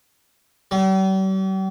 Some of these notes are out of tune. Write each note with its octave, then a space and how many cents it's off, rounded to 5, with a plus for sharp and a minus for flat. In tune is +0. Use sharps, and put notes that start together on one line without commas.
G3 -45